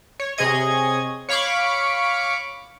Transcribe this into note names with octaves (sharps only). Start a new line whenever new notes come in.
C#5
C3 G#4 C#5 D#5 G#6
C#5 F5 B5 C#6 D6